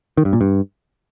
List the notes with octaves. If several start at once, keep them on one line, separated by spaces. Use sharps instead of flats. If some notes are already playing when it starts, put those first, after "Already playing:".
D#3
G2
A#2
G2